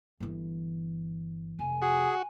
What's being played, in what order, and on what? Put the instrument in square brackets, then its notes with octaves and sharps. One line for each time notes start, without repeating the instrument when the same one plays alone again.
[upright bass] G1 E3
[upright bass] F1 [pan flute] G#5
[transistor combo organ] F#4 [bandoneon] G#4